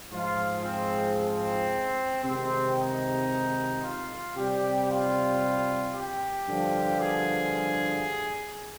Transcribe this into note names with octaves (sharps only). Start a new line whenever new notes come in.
G#2 F3 G#3 F4
C4
C4
C3 D#3 G#3 C4
D#4
F4
C3 G3 G4
F4
G4
G2 D3 F3
G#4